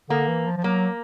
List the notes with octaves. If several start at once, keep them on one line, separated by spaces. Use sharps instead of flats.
D3 A#3
E3
F3
F3
F#3 A#3